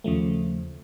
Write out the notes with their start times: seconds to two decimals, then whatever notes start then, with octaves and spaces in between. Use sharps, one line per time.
0.04 D#2 C#3 F3 A3